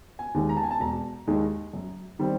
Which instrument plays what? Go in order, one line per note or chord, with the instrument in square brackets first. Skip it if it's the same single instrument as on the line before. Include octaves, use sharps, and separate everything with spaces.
[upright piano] G#5
D#2 D#3 G#3
A#5
A5
G#5
A5
E1 A#5
D#2 D#3 G#3
F#2
D#3 G3 C4